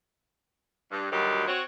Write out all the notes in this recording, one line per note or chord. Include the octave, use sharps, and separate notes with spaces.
G2
D2 D#3 F#3 G3
C4 F#4 C#5